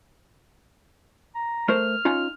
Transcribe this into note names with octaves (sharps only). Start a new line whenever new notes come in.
A#5
A3 A#4 C5 F6
C#4 D#4 F4